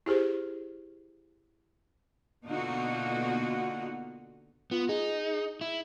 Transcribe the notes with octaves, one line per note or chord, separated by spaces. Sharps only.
E4 G4 G#4 C5
B2 D3 A#3 D#4 F4 F#4
B3 F4
D#4 G#4
E4